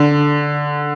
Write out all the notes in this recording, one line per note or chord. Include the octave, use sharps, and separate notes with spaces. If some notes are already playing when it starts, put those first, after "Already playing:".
Already playing: D3